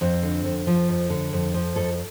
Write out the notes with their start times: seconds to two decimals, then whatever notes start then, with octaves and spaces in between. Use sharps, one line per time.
0.01 F2 C4
0.23 D3
0.45 F2
0.67 F3
0.89 F2
1.10 D3
1.33 F2
1.54 F3
1.76 F2 A4